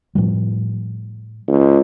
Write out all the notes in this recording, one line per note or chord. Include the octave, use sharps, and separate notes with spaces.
A2 F3 G3
C#2